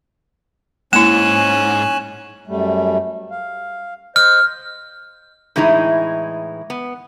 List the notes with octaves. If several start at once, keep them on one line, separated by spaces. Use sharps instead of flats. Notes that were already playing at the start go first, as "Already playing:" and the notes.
G#2 A#3 C#4 E4 G#5 F#6 E7
F#2 G3 A3
F5
C5 D#5 F6
A2 E3 G#3 D#4 E4
B3